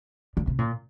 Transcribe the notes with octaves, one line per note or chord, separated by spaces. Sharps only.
D3
C3
A#2